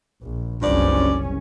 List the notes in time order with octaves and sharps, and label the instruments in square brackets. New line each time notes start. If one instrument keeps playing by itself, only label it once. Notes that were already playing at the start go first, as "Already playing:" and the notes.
[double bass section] A#1
[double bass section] F#1 C2 C#4 [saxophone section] G2 F3 D5